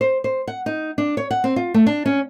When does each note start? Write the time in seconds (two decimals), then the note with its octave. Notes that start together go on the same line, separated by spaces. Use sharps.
0.01 C5
0.24 C5
0.47 F#5
0.66 D#4
0.98 D4
1.17 C#5
1.31 F#5
1.44 C4
1.56 F4
1.74 A3
1.87 D4
2.06 C#4